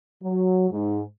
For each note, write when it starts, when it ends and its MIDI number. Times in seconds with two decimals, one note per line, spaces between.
0.23 0.67 54
0.70 1.01 44